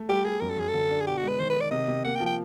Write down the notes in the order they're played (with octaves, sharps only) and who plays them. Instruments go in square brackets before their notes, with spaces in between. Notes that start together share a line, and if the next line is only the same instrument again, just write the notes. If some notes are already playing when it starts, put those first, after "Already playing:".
Already playing: [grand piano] A3
[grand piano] G3 [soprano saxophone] G4
[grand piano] G3 [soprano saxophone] G#4
[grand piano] F#2 [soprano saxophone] A#4
[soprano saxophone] A4
[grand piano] F#2 [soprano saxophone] G#4
[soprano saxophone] A4
[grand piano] D3
D4
[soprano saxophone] G#4
[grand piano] B2 [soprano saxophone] G4
[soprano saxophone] F#4
[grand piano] G#3
[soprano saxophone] B4
[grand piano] D#3 [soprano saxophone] C5
[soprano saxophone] B4
[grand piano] D#3
[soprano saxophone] D5
[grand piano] C3 [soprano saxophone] D#5
[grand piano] C3
[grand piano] A#3 [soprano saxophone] F#5
[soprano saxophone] G5
[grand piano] F3
[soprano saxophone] G5